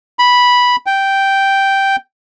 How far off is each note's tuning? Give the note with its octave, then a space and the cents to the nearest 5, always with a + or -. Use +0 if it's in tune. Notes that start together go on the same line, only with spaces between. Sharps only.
B5 -5
G5 -5